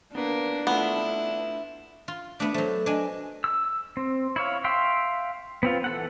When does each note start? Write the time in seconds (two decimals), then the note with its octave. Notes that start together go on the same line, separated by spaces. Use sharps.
0.15 A#3 B3 D4 B4
0.67 A3 B3 E4 F4
2.08 F4
2.40 A3 B3 D4
2.54 F#3 A3 C5
2.86 D4 D#5 G#5
3.44 E6
3.97 C4
4.36 E4 C#5 F5
4.64 E5 F5 G5 C6 E6
5.63 B3 C4 F4
5.84 E3 A4 F#5